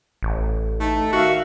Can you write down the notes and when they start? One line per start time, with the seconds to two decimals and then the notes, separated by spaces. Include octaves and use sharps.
0.23 A1
0.80 A3 D#4
1.13 D#3 F#4 E5 F5